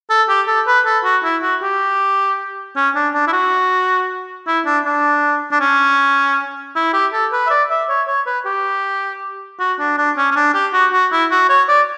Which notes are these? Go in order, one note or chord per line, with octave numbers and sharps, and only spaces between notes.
A4
G4
A4
B4
A4
F#4
E4
F#4
G4
C#4
D4
D4
E4
F#4
E4
D4
D4
D4
C#4
E4
G4
A4
B4
E5
D5
E5
C#5
C#5
B4
G4
F#4
D4
D4
C#4
C#4
D4
G4
F#4
F#4
E4
F#4
C#5
D5